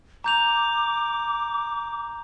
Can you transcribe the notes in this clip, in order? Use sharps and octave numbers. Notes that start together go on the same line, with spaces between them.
A#5 D6 G6 F7